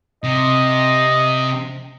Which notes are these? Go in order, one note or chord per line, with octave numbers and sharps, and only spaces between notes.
C3 D#5